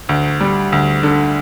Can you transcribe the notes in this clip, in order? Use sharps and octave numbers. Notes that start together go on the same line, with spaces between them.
D2
G3
D2
D3